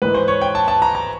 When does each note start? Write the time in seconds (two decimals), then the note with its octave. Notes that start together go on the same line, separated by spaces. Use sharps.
0.02 G#2 E3 G#3 B4
0.14 C5
0.28 C#5
0.41 G5
0.55 A5
0.68 A5
0.82 A#5
0.95 A#5